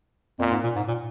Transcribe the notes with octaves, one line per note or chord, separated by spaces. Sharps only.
F2 A#2
G#2
A#2
G#2
A#2